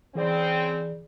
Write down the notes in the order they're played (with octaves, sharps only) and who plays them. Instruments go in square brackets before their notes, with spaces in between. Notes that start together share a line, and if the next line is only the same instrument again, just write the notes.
[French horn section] C#3 C4 [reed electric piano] E3 G#4 D5